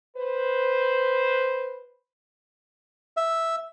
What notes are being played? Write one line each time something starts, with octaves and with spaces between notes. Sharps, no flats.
B4 C5
E5